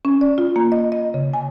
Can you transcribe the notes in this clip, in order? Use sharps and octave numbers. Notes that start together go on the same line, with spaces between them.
C#4
D5
F4
A#3
D#5
D#5
C#3
G#5